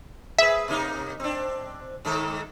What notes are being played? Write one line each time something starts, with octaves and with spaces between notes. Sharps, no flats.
G#4 B4 E5
C3 A#3 D#4
C4 D4
G#2 D#3 A4